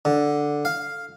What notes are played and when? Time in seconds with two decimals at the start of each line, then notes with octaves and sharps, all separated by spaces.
0.05 D3
0.65 F5